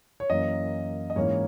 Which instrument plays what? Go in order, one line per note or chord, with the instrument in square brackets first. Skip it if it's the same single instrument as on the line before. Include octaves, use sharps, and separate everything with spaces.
[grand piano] C#5
F#2 E3 A#3 C#4 D#5
D#5
G#2 E3 A#3 C#4 C#5